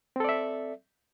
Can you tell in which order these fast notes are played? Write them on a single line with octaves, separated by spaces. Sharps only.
C4 A4 D5 E5